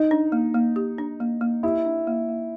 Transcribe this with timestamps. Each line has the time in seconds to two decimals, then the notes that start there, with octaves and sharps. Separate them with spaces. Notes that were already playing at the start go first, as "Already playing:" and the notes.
Already playing: D#4
0.11 D4
0.32 A#3
0.54 A#3
0.76 G4
0.98 D4
1.20 A#3
1.41 A#3
1.63 E4 G4
1.85 D4
2.07 A#3
2.29 A#3